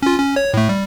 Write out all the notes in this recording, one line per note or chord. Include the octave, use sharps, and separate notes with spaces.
C#4 F4
C#4
C#5
A2 A3
G3